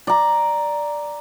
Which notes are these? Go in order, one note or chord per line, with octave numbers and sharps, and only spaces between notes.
D5 A#5